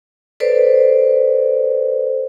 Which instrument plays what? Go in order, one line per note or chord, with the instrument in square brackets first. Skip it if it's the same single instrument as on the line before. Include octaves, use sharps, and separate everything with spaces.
[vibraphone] A4 B4 C5 D5